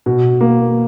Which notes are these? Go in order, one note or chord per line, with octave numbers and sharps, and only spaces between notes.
B2
A#3